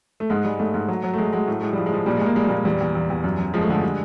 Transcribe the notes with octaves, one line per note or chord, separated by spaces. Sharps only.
A3
G#2 G#3
G3 G#3
G#2 A3
G#2
F#3
F#3
A3
F#3 G#3
F#3 G#3
A2 A3
A2 G#3
F3 G3
G#3
F3
A#2 G3
G#3
A#2
A#3
G3 G#3
G3
A#2 G#3
E2 G3
E2
E2
E2
F#2
F#2
F3 G#3
A3
D3 G#3
G3